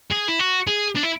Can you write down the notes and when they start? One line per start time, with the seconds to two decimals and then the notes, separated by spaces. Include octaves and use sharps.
0.11 G#4
0.28 E4
0.39 F#4
0.68 G#4
0.95 D4
1.03 E4